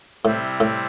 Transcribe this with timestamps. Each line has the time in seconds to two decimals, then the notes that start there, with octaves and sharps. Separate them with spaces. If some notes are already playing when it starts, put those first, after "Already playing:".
0.25 A2 C3 G3 C4 E4
0.60 A2